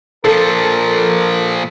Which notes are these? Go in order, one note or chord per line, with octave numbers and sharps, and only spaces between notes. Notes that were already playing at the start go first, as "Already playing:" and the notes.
A#2 F3 A4 A#4